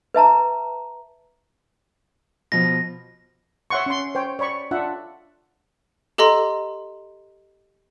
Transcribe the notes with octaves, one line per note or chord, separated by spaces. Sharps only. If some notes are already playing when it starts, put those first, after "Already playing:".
B4 E5 A5 A#5
B2 F3 A#6
C#5 E5 F#5 C6 C#6
C#4 C6
C5 C#5 G5
C#5 D5 B5 C#6
D4 F4 E5 F#5
G4 A4 D#5 A#5 C6